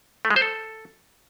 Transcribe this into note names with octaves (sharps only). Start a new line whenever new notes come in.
A3
G#3
C5
A4